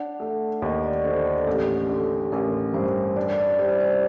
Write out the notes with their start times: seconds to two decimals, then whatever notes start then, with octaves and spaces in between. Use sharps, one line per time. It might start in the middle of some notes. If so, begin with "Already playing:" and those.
Already playing: D4 F#5
0.20 A3
0.62 D#2 D#5
0.83 D5
1.04 D3 C5
1.26 A4
1.46 A1 G4
1.89 D3
2.32 A1 A#4
2.74 G2 C5
3.16 D4 D5
3.38 D5
3.59 G3 C5
3.80 C5